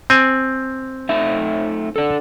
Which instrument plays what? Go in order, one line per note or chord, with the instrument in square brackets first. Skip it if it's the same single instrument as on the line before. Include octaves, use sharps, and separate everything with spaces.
[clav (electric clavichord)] C4 G#5
[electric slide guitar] A3 D#4 E5
D4 A4